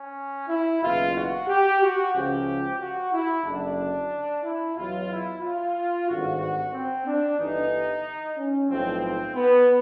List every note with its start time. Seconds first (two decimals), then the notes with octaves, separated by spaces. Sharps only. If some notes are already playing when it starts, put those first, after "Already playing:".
Already playing: C#4
0.49 E4
0.83 F#1 E2 B2 F4
1.16 F#4
1.48 G4
1.81 F#4
2.14 C#2 C#3 F3 G4
2.80 F#4
3.13 E4
3.44 F#1 F#2 D3 D4
4.43 E4
4.76 E2 B2 F#3 F4
5.09 E4
5.41 F4
6.08 G#1 G2 D3 F#4
6.40 F#4
6.73 C4
7.06 D4
7.39 G1 G2 E3 D#4
8.37 C#4
8.70 B1 A2 F3 C4
9.04 C4
9.35 B3